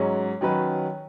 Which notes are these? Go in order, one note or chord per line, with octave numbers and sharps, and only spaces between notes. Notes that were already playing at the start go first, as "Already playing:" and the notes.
Already playing: G#2 F#3 C#4
D#3 F#3 C#4 B4